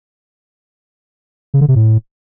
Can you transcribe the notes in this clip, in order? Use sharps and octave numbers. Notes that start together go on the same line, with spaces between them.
C#3
D3
C3
A2